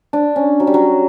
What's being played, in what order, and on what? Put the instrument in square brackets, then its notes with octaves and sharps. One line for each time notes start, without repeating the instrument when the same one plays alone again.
[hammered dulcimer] D4
C#4
F#3
G3
F#3